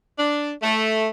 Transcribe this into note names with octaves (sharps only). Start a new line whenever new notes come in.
D4
A3